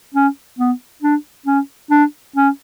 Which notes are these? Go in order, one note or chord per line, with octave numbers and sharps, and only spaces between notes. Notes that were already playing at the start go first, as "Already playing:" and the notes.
C#4
B3
D4
C#4
D4
C#4